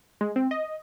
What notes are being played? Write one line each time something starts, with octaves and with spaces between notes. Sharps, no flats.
G#3
C4
D#5